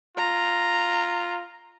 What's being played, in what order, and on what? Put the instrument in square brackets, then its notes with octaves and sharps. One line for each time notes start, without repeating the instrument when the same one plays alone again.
[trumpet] F4 [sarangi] A#5